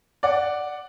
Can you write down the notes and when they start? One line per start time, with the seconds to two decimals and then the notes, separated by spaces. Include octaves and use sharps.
0.23 D5 F#5